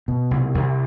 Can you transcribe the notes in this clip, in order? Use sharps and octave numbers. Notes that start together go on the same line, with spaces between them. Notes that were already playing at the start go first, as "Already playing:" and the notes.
B2
C2
C2